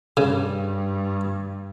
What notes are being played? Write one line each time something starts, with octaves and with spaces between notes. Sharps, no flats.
G2 C#3